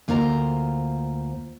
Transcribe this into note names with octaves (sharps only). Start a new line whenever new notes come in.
D2 A#3 F4 C5 A5 A#5